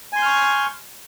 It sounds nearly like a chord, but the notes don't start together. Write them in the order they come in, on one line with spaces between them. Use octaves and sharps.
G#5 C6 G6 F6 C#6